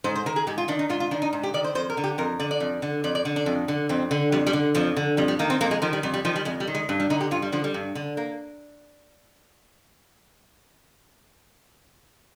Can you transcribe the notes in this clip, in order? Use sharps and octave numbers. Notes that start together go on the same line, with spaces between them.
G#2 C5
C5
D#3 A#4
G#4
G#2 G4
F4
D#3 D4
D#4
G#2 F4
F4
D#3 D4
D#4
G#2
G4
D#3 D5
C5
F2 C5
A#4
D3
G4
F2 A#4
D3 D5
D5
F2
D3
F2 D5
D5
D3
D4
F2
D3
F2 C4
D3
F2 G3
G3
D3
F2 F3
D3
F2 G3
G3
D#3 A#3
C4
F2 A#3
G#3
D#3 F3
G3
F2 G3
G3
D#3 F3
G3
F2 G#3
G3
D#3
G#3
G2
G3
D3 D#4
G4
G2 F4
G3
D3 F3
G3
G2
D3
A#3